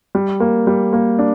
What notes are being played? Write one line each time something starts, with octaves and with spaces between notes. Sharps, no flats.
G3
A#3
G3
A#3
D4